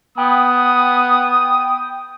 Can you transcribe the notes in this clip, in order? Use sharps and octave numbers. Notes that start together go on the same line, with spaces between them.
B3 G5 D#6